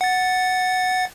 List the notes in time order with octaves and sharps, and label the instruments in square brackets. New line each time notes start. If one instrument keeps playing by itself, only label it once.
[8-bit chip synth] F#5 A6